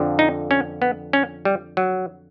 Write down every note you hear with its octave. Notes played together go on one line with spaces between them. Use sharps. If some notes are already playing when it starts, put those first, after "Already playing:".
Already playing: F2 D3 F3
D#4
C#4
B3
C#4
G3
F#3